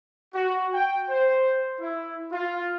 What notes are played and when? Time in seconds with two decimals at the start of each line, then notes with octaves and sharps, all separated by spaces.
0.34 F#4
0.73 G5
1.09 C5
1.80 E4
2.32 F4